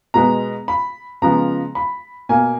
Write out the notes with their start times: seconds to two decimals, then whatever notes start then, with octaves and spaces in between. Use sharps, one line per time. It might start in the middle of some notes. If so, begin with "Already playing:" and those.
0.14 B2 G#3 B3 A#5
0.68 B5
1.22 C#3 F3 G#3 B3 A#5
1.75 B5
2.29 B2 A#3 G#5